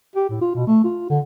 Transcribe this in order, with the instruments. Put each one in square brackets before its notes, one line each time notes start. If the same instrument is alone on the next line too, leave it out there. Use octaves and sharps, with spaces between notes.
[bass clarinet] G4
A2
F4
B2
A3
F4
D3